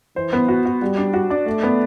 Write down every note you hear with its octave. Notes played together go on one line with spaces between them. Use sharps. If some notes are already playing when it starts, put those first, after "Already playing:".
E3 C5
B3
F#4
F#4
G3 F#4
D4
F#4
D4
A3 D5
B3